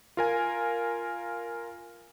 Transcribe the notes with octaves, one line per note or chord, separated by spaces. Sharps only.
F4 A#4 G#5